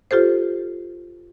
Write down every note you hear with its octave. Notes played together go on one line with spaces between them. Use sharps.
F4 G4 A4 C5